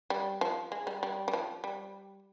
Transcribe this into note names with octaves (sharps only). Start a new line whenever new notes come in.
G3
F3
G#3
G3
G3
G3
F3
G3